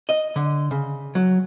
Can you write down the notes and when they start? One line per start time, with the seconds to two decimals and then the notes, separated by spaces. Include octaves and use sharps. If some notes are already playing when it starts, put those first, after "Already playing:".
0.09 D#5
0.36 D3
0.71 C#3
1.15 F#3